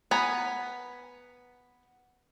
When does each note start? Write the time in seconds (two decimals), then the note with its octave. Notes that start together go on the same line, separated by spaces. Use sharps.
0.11 B3 B4 G#5 A#5